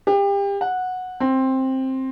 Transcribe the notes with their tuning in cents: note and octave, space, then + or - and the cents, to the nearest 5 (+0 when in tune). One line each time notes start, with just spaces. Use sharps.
G4 +30
F#5 -10
C4 +10